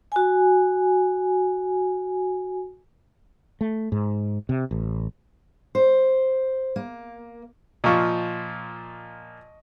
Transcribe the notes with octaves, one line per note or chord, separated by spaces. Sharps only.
F#4 G#5
A3
G#2
C3
A1
C5
A#3
A#2 F3 D#5 C#6